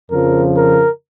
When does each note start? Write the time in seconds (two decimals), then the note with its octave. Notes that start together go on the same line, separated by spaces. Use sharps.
0.10 F2 C#3 F3 A#4
0.57 A#4